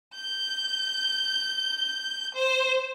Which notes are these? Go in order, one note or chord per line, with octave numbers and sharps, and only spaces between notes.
G6
C5